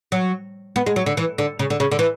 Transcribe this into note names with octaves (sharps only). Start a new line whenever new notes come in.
F#3
B3
G#3
F#3
D3
E3
D3
C#3
D3
C#3
D3
E3